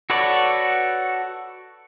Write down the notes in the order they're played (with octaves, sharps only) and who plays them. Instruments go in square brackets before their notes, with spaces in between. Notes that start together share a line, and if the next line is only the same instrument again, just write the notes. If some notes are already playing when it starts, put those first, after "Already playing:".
[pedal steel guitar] F#4 A4 B4 C#5 D5